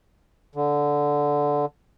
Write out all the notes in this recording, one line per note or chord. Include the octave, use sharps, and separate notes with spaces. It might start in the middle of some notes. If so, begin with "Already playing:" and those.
D3